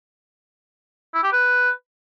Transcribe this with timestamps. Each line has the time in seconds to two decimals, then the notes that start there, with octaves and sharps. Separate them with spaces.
1.14 E4
1.23 G4
1.33 B4